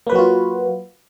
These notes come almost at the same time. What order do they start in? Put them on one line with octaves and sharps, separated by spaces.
A#3 B4 F#3 F#4 F4